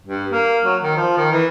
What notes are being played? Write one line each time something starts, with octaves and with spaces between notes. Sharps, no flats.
G2
A#3
F#3
D#3
F3
D#3
E3